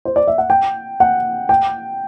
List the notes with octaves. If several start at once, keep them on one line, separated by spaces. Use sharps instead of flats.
C5
D5
E5
F#5
G5
F#5
G5